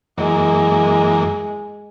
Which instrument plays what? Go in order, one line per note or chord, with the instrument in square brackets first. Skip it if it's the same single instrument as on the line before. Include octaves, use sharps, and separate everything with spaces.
[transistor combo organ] F#2 E3 A#3 [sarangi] G#3